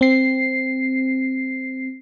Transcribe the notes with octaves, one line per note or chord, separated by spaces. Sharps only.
C4 C7